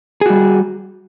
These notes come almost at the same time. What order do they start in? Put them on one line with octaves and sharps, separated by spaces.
G#4 F#4 G3